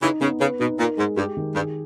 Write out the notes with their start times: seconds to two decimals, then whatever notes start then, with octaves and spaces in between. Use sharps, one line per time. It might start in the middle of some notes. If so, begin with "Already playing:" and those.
0.01 C#3 E3 D#4
0.21 C#3 B3
0.40 C#3 B4
0.60 B2 D#4
0.79 A#2 A#4
0.97 G#2 G#3
1.17 G2 G4
1.37 D#3
1.55 G2 G#4